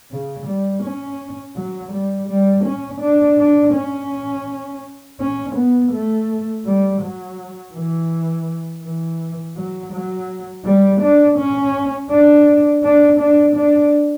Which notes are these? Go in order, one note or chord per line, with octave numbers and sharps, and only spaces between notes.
C#3
G3
C#4
F#3
G3
G3
C#4
D4
D4
C#4
C#4
B3
A3
G3
F#3
E3
E3
F#3
F#3
G3
D4
C#4
D4
D4
D4
D4